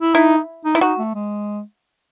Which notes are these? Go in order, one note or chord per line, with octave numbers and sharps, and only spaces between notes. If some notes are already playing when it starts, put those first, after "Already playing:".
E4
D#4 E4
D#4
E4
D#4 F#4
A3
G#3